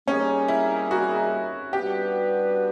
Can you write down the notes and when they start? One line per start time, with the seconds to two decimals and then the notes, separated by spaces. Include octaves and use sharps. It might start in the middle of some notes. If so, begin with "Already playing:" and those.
0.07 G3 A#3 C#4 D#4 G#4
0.48 E4
0.91 F#4
1.73 G3 B3 D4 F#4 G4 B4